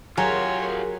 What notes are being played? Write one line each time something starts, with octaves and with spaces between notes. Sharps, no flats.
F#3 F4 G4 G#4 A#4 C#5 G#5 C6